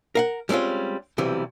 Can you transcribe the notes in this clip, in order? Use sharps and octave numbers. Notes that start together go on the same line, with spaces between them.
A#4 F5 F#5
G3 G#3 C4 C#4 F4
B1 C3 E3 G3